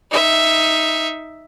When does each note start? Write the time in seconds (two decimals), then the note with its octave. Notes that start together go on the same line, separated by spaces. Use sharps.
0.11 D#4 E5